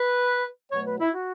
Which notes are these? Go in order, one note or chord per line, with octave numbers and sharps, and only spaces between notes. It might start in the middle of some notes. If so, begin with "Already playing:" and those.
Already playing: B4
B2 F#3 A3 C#5
B4
E4
F#4